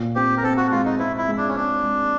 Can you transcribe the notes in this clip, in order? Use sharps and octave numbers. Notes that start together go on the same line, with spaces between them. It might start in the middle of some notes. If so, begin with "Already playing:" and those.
Already playing: A#2
C4 G4
A#4
C4 A4
F#4
G#3 F4
D#4
C4 E4
E4
G#3
D4
C#4
C4 D4
G#3